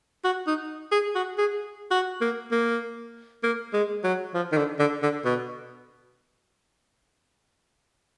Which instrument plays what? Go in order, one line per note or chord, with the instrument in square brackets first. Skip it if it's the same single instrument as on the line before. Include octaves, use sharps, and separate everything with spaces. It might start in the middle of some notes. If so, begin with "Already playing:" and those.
[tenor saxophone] F#4
D#4
G#4
F#4
G#4
F#4
A#3
A#3
A#3
G#3
F#3
F3
D#3
D3
D3
D3
B2